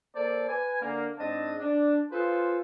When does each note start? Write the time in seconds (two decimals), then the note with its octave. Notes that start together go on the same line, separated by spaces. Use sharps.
0.15 A#3 A4 C5 D5
0.48 B4 G#5
0.80 D3 A#3
1.18 G#2 C4 D4 D#5 A5
1.59 D4
2.11 F4 G#4 A4 B4 C5